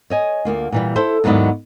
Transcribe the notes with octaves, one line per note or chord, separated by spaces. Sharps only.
C#5 D#5 G#5
D2 A#3 F4
A#2 E3 G3
E4 A4 C5
D#2 G#2 F#3 B3 E4 D5